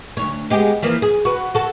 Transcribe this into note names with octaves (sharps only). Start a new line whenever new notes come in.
D2 G#2 C#5
G#3 B3 G4
E3 F3 A#3
G#4
F#4 B4
F#4 A4